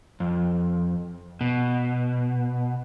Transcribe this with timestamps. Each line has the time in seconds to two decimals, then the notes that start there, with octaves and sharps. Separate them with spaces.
0.20 F2
1.41 B2